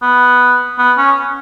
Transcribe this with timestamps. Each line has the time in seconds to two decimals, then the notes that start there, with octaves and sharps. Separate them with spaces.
0.02 B3
0.78 B3
0.98 C#4